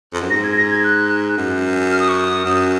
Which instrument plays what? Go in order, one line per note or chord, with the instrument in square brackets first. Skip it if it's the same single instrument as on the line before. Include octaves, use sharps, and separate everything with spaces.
[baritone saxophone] F2
F#2
[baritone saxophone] G#2 [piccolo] A#6
[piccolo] G#6
A#6
G#6
F#6
[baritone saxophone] F#2
[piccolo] F6
D#6
C#6
D#6
[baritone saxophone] F#2